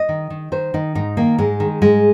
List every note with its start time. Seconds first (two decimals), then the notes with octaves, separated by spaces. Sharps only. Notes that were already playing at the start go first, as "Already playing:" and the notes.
Already playing: D#5
0.09 D#3
0.30 D#3
0.52 D#3 C5
0.74 D#3 D#4
0.95 G#2 D#4
1.17 D#3 A#3
1.38 G#2 G#3
1.60 D#3
1.82 G#2 G#3